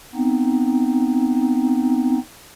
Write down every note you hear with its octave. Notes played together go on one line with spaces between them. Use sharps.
B3 C4 D#4